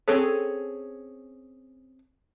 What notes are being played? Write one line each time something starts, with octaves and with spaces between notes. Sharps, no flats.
C4 C#4 G#4 A4 C#5